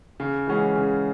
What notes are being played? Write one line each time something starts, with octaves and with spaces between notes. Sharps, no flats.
C#3
E3 G#3 C#4 F#4
C#3